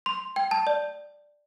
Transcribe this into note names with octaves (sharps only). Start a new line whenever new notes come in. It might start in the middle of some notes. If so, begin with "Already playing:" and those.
C6
G5
A5
D5